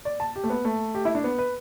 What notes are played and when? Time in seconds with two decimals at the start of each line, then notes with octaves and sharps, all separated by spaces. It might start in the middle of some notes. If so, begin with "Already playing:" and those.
0.05 D5
0.20 A5
0.36 G4
0.44 A3
0.50 B3
0.65 A3
0.95 G4
1.05 E4
1.15 D4
1.24 B3
1.39 B4